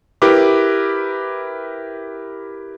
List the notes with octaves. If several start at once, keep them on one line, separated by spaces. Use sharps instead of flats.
E4 G4 A#4 B4 D6